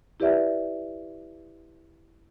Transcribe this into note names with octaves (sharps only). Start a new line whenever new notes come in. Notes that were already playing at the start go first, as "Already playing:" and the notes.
E4 G4 B4 D5 E5